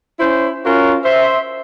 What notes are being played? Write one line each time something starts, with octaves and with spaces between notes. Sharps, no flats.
C#4 E4 C5
C#4 F4 F#4 A#4
C5 E5